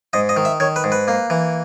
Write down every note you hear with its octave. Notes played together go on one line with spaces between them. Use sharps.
G#2 D#5
D#5
D#3
E5
D#3 C#5
B4
G#2
B4
A#3
E3